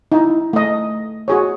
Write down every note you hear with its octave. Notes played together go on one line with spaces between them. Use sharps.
D#4 E4
A3 D#5
F#4 G#4 C#5